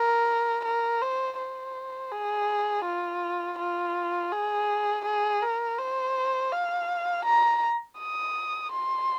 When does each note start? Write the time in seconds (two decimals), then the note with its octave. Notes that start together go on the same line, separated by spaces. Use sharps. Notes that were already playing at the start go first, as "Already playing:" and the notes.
Already playing: A#4
0.65 A#4
1.02 C5
1.38 C5
2.12 G#4
2.85 F4
3.59 F4
4.33 G#4
5.05 G#4
5.42 A#4
5.78 C5
6.52 F5
7.26 A#5
7.99 D#6
8.72 C6